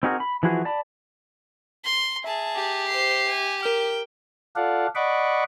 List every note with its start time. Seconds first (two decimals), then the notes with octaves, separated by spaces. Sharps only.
0.03 C4 D#4 F#4 G#4 A#4
0.20 B5
0.43 E3 F3 E4 F#4 G#4
0.65 D5 A5 B5
1.85 C6
2.24 G#4 E5 A5
2.55 G4
2.88 C5 C7
3.28 G#5
3.63 A#4 G5 F6
4.56 F4 A4 D5 F5 F#5
4.95 D5 D#5 F#5 B5 C#6 D6